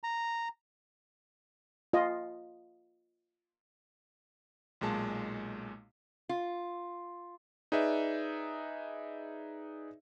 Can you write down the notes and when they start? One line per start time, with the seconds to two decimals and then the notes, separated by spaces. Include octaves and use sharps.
0.04 A#5
1.93 F4 D#5
4.81 B1 A#2 G#3 A5
6.29 F4
7.72 D#4 G#4 B4 D5 E5